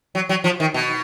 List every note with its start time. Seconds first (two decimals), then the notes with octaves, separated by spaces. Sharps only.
0.15 F#3
0.29 F#3
0.44 F3
0.60 D#3
0.74 B2